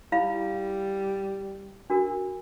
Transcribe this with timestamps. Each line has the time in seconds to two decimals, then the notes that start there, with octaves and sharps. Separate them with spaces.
0.12 G3 E4 F5 B5
1.90 D4 F#4 A#4